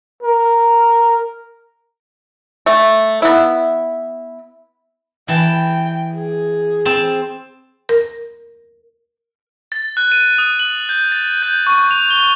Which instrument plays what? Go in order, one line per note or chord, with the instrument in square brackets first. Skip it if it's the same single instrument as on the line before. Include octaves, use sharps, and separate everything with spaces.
[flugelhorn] A#4
[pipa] A3
B3 E4
[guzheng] E3 A5 [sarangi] G5
[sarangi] G#4
[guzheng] C4 A5
[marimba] A#4
[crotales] A6
F#6
D#7
D#6
F#7
G6
A6
G6
C#6
F7
G7